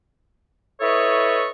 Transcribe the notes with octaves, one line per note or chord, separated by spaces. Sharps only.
E4 A4 B4 C#5 D#5 C#6